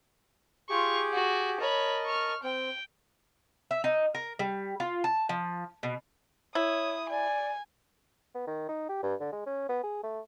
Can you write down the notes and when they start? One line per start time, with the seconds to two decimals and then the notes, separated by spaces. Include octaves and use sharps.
0.70 F4 G4 G#4 C#6 D6
1.14 F#4
1.60 A#4 C#5 D#5 A5 B5
2.06 C#6 F6
2.43 C4 G5
3.71 E5
3.84 D#4
4.15 A#4
4.39 G3
4.80 F4
5.04 A5
5.29 F3
5.83 B2
6.55 E4 C#5 D#6
7.10 D5 G#5
8.35 B3
8.47 D#3
8.69 D#4
8.89 G4
9.03 G2
9.20 D3
9.32 G#3
9.46 C#4
9.69 B3
9.83 G#4
10.03 A3